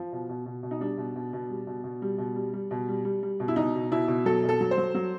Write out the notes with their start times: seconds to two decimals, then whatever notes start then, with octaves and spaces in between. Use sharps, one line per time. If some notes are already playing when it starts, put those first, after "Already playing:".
Already playing: F3
0.12 B2
0.29 B2
0.46 B2
0.63 B2
0.71 D#4
0.80 G3 D4
0.98 B2
1.15 B2
1.33 B2
1.50 G3
1.67 B2
1.84 B2
2.02 G3
2.18 B2
2.35 G3
2.53 G3
2.71 B2
2.88 G3
3.05 G3
3.23 G3
3.40 B2
3.48 E4
3.56 B2 D#4
3.75 B2
3.91 B2 E4
4.08 B2
4.25 F#3 A4
4.44 B2
4.49 A4
4.60 F#3
4.71 C5
4.77 F#3
4.94 F#3